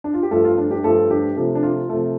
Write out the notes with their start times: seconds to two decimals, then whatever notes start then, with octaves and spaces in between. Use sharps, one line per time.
0.04 D4
0.14 F4
0.23 G4
0.31 G2 F3 A3 F4 A4
0.44 F4
0.58 D4
0.71 D4 G4
0.84 G2 F3 A3 F4 A4
1.10 D4 G4
1.36 C3 F3 A3
1.55 D4
1.63 F4
1.89 C3 F3 A3